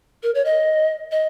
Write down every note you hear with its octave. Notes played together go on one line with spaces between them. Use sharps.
A#4
C#5
D#5
D#5